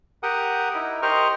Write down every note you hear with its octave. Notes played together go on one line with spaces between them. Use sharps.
G4 A#4 F#5 G5 D#6
D#4 E4
G4 A#4 C5 D#5 C#6 F6